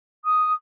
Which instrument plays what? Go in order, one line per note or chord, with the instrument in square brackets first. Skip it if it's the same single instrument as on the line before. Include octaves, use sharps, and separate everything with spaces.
[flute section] D#6